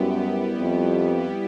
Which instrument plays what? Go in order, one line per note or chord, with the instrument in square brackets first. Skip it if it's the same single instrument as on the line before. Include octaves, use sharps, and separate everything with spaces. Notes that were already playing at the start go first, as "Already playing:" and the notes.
Already playing: [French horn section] F#2 [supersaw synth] G3 B3 E4 G4
[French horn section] F2